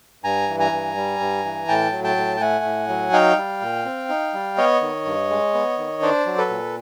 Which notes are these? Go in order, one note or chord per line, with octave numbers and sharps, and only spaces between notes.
G2 G#5 A#5
E3
G#5 A#5
G2
G3
G2
E3
A2 G5 A5
F#3
G5 A5
A2
G5
A3 F#5 G#5
A2
F#3
D#4 F5 G5
G3
A#2
C4
D#4
G3
B3 C#5 D#5
D#3
G2
G#3
B3
D#3
D4 C5 D5
F#3
A4 B4
A#2